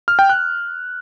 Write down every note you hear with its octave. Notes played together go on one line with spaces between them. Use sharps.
F6
G5
F#6